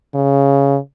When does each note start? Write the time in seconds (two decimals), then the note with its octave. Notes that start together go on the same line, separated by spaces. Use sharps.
0.15 C#3